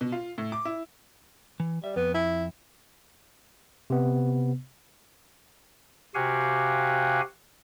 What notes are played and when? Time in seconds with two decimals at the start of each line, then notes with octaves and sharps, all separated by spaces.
0.01 B2
0.12 F4
0.38 A2
0.52 D6
0.65 E4
1.60 E3
1.84 G3 E5
1.96 F2 B3
2.14 E4
3.90 C3 B3
6.15 C3 F#4 G4 F5 F#5 G#5